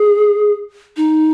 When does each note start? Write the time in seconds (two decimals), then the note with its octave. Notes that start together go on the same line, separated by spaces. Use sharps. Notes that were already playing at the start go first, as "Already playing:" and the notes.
Already playing: G#4
0.97 D#4